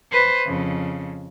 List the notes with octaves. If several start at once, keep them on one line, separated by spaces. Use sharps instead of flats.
B4 C5
F2 C#3